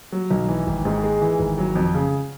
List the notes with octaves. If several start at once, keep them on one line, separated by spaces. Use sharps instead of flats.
F#3
B1
E3
G#1
G#2
G#3
E3
G#1
F#3
F2
C#3